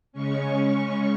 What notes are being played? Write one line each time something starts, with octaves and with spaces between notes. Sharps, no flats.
C#3 G#3 C#4 C#6